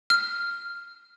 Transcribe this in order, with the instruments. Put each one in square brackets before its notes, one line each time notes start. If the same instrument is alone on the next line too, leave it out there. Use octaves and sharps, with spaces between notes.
[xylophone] F6